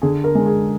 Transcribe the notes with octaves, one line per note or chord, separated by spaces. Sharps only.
D3 G#4
A#4
G#3
G#4